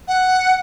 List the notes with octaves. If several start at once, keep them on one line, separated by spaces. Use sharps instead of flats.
F#5